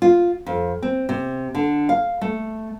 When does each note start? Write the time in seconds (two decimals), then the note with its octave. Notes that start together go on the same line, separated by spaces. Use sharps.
0.02 F4
0.46 F2
0.83 C4
1.09 C3
1.55 D3
1.89 F5
2.21 A3